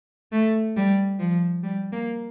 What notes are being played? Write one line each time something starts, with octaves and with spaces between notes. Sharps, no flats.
A3
G3
F3
G3
A#3